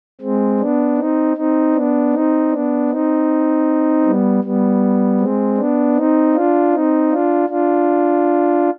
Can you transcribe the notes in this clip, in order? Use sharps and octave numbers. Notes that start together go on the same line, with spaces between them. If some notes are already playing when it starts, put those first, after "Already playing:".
G#3 C4
B3 D4
C4 D#4
C4 D#4
B3 D4
C4 D#4
B3 D4
C4 D#4
G3 B3
G3 B3
G#3 C4
B3 D4
C4 D#4
D4 F4
C4 D#4
D4 F4
D4 F4